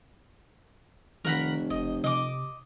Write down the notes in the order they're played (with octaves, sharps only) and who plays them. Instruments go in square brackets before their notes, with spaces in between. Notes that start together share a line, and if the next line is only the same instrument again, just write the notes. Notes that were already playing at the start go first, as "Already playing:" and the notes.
[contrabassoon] F1 [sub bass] D#3 [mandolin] A#4 F#5 B5
[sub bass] F#1 [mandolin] D#5
[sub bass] C3 [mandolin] D#5 D6